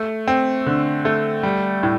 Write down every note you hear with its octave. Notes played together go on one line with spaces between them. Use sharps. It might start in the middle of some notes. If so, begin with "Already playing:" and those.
Already playing: A3
C4
D3
A3
G3
A2